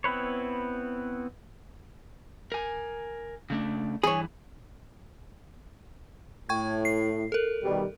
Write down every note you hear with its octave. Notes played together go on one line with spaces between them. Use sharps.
B3 C4 E4 B4 C#5
A#4 G#5
C#3 A3 D4
G2 E3 G#4 C#5 B5
A2 G5 C#6 G#6
C7
A4 A#4
B2 D#3 G3